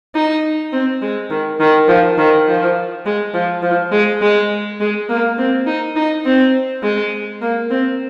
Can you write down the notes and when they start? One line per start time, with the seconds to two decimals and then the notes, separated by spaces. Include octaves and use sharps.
0.15 D#4
0.73 C4
1.02 G#3
1.30 D#3
1.60 D#3
1.88 F3
2.18 D#3
2.47 F3
3.06 G#3
3.34 F3
3.63 F3
3.92 G#3
4.22 G#3
4.80 G#3
5.09 A#3
5.38 C4
5.67 D#4
5.96 D#4
6.25 C4
6.83 G#3
7.42 A#3
7.70 C4